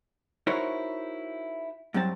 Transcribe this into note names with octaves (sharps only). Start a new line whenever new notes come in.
D#4 E4 F#4 A#4 C5 C#5
G2 F#3 C4 A5